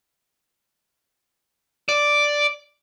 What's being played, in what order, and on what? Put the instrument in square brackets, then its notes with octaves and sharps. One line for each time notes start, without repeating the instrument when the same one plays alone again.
[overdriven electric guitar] D5